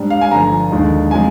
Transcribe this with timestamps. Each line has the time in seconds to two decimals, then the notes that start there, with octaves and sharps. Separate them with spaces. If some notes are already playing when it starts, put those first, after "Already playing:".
Already playing: G#2 G3 D4
0.10 F5
0.21 G#5
0.31 G1 G2 D3 F3 A#5
0.71 D#2 D3 G#3 D#4
1.11 C3 F3 G#3 G#5